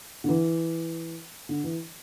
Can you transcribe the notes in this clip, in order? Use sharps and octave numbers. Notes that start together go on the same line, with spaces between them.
D3
E3
D3
E3